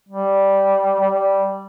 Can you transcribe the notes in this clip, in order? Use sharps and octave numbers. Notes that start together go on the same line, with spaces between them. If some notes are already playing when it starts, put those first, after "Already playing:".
G3
G3